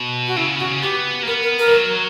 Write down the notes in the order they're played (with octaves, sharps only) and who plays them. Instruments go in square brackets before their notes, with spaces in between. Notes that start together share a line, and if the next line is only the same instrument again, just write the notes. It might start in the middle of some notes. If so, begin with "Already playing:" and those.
Already playing: [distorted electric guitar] B2
[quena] F#4
[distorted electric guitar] C#3 [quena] E4
[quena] F#4
[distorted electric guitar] B3 [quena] G4
[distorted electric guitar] A#3
[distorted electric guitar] B3 [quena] A#4
[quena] A#4
A#4
[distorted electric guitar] G3
F#3